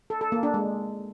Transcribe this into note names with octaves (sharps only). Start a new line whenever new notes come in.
A4
A4
A#3
D4
G#3